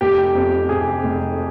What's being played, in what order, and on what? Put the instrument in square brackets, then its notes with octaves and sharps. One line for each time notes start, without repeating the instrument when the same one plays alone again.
[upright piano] F1 [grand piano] G4
[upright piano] F2
[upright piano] C3 [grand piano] G#4
[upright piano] F1